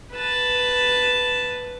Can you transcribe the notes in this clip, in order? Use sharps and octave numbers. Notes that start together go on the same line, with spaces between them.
B4 A5